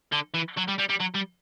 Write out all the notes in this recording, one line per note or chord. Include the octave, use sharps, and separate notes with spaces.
D3
E3
F#3
G3
G3
G3
F#3
G3